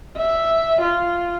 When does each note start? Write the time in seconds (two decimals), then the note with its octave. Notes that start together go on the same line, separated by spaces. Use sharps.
0.17 E5
0.81 F4